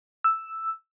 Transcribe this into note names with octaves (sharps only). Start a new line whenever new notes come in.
E6